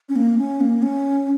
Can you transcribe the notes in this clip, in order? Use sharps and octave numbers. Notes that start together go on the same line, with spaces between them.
C#4
A#3
C#4
A#3
C#4